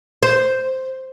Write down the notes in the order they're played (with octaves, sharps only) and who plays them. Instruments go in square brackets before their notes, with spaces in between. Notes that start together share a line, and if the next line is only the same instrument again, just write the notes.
[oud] C5